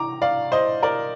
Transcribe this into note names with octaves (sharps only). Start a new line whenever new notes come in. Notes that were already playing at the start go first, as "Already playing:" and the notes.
Already playing: A#5 D6
D5 F5
C5 D#5
A#4 D5